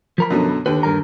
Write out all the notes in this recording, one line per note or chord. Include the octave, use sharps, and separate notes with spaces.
F3 A#4 B5
F#2 B2 D3
D#2 D3 B4
G2 A#4 A#5